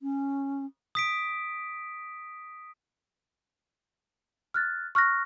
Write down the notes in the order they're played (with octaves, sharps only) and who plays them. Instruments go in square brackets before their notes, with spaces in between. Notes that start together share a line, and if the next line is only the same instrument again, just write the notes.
[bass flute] C#4
[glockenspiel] D#6 B6 D7
[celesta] F6 F#6 A6
C#6 F6 F#6 A#6